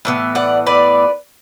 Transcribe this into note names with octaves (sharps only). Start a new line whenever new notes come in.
A2 E3 B3
D5 F#5
B4 D5